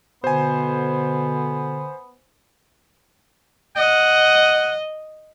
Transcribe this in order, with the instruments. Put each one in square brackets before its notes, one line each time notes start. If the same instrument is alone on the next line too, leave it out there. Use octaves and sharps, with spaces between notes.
[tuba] B2 [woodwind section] D3 [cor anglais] B3 [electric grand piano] C5 G#5
[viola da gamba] D#5 [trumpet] F#5